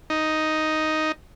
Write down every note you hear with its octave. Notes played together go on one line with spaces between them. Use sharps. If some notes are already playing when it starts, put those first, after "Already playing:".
D#4